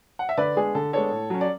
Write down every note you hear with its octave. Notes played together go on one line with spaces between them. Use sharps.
F#5
E5
D3 B4 D5
G#3 B3 D4 G#4
D3 A4
G#3 B3 D4 A4 C#5
A2
F#3 C#4
D5